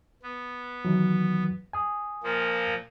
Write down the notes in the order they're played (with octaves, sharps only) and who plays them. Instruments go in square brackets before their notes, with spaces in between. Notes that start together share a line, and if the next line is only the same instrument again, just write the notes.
[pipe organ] B3
[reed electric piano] D#3 E3 F#3
G#5 D#6
[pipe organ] A#2 F3 A#3